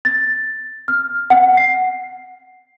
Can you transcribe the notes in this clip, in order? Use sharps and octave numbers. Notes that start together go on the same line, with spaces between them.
A6
F6
F#5
C7